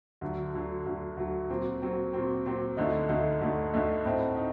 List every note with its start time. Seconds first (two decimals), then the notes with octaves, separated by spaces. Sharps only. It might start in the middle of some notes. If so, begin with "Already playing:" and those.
0.21 D2 D3 F#3
0.54 D2 D3 F#3
0.86 D2 D3 F#3
1.17 D2 D3 F#3
1.50 A#2 F#3 C4
1.82 A#2 F#3 C4
2.13 A#2 F#3 C4
2.46 A#2 F#3 C4
2.77 D2 D3 A3 D#4
3.09 D2 D3 A3 D#4
3.41 D2 D3 A3 D#4
3.73 D2 D3 A3 D#4
4.05 A2 A3 C4 D#4
4.36 D#4